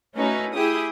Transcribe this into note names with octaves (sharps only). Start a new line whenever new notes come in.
A3 C#4 D#4 E4 F#4 B4
E4 G4 G#4 G5 D#6